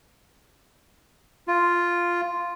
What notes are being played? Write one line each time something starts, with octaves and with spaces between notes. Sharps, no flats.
F4